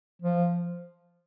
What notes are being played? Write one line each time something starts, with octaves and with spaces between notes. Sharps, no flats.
F3